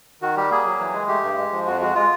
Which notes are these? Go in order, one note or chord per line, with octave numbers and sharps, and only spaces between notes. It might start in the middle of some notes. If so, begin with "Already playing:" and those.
D#3 F#4
G3 G4
A#3 G#4
F#3
E3
G#3
A3 G4
G2
G#3
F3
F2 F#4
G#3 F#4
G#3 F4